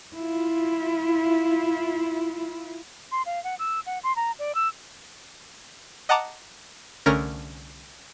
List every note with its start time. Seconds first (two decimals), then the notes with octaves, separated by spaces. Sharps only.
0.16 E4 F4
3.12 C6
3.26 F5
3.44 F#5
3.59 E6
3.86 F#5
4.03 C6
4.16 A#5
4.39 D5
4.55 E6
6.09 D#5 F#5 A5 A#5 D6
7.06 C2 D3 A3 C#4 A#4 A#6